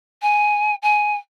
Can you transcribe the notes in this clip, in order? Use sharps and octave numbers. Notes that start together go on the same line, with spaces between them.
G#5
G#5